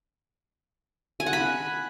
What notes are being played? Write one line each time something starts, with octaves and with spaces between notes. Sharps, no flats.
G#5
F#5
B5